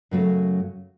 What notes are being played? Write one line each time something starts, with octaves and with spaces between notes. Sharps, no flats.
F#2 C#3 F#3 A3